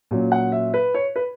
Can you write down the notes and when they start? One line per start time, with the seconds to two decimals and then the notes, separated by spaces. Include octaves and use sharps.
0.11 A#2 F#3 C#4
0.32 F#5
0.52 E5
0.74 B4
0.94 C#5
1.16 B4